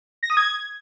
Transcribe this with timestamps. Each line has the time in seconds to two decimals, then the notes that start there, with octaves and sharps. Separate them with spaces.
0.23 A#6
0.30 D#6
0.37 G#6